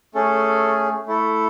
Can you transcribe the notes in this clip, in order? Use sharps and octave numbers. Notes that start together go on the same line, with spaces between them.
A3 C#4 G#4 A4
A3 E4 A4